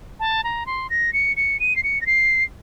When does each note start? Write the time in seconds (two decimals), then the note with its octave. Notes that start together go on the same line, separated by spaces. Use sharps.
0.20 A5
0.44 A#5
0.66 C6
0.90 A#6
1.13 C#7
1.36 C#7
1.60 D#7
1.76 C7
1.83 C#7
2.01 A#6
2.06 C7